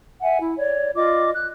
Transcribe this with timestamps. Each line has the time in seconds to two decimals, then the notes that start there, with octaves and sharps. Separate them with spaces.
0.22 E5 F#5 G#5
0.41 E4
0.58 C#5 D5
0.96 F4 D5 D#5 D6
1.35 F#6